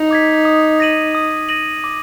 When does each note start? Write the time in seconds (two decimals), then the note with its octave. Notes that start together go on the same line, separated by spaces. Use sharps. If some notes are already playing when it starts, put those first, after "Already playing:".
Already playing: D#4
0.11 D6 G#6 B6
0.45 D#6
0.80 A#6 D#7 F#7
1.15 D#6
1.49 A#6 D#7 F#7
1.84 D6